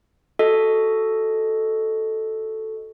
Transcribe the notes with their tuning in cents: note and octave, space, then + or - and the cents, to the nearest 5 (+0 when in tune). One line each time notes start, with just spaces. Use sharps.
F#4 +5 A4 +0 D#5 +0